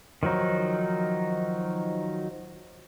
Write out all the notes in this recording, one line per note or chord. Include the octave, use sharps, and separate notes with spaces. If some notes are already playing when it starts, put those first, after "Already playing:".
D#3 F3 F#3 D#4